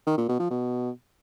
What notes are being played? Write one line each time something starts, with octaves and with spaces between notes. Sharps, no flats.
D#3
A#2
B2
F3
B2